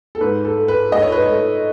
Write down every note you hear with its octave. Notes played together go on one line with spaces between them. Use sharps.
A4
G#2 B4
A4
A3
B4
A3 D#5
C#5
B4
C#5
A3